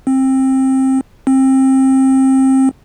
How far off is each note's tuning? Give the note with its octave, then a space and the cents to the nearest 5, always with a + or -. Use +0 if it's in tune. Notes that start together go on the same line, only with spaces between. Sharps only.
C4 +20
C4 +25